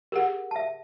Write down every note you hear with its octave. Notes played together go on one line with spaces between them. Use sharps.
G4 G#4 A#4 F#5
E5 A5